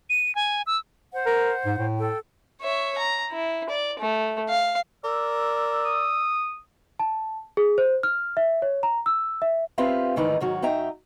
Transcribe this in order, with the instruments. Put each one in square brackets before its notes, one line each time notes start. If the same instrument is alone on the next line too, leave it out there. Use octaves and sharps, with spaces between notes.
[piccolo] D#7
G#5
E6
[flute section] C5 F#5
[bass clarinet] A#4
G#2
A2
[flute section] A4 G5
[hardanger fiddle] C#5 E5
A#5
E4
D5
A3
F5
[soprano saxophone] A#4 [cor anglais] D5 [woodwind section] E6
[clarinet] D#6
[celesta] A5
G#4
C5
F6
E5
C#5
A#5
E6
E5
[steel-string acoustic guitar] C4 F4 G4 B4 E5 F5
D2 G#2 D#3 E3 D#4 B4
G#2 D#3 F#3 F#4
F#2 D#4 E5 G5 A#5